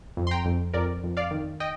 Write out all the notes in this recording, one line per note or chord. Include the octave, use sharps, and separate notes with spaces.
F2
C6
G5 A#5
F2
F2 A#4 D5
F2
D5 F5
D#3
D#5 G5